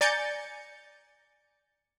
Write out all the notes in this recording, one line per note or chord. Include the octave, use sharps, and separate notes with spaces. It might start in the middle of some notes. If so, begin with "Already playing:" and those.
D5 G#5 A#5 G6 A6 C#7